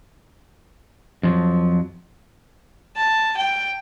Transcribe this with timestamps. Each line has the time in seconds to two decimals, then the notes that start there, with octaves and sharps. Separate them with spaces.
1.23 F2 F3 F#3
2.96 A5
3.37 G5